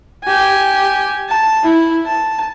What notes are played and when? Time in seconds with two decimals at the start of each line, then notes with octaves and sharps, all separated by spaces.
0.24 G4 G#5
1.28 A5
1.64 E4
2.06 A5